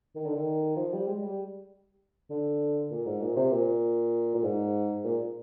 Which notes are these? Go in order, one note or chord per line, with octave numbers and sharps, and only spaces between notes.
D#3
D3
D#3
F3
G3
G#3
G3
D3
A#2
G#2
A#2
C3
A#2
A#2
G#2
A#2